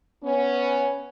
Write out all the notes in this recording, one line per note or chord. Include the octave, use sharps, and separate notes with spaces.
B3 C#4